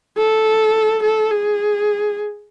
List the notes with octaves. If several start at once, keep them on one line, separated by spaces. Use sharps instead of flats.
A4
A4
G#4